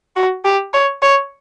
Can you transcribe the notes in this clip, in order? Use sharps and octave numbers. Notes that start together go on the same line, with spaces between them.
F#4
G4
C#5
C#5